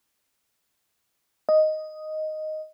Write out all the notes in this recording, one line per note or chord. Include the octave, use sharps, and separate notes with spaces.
D#5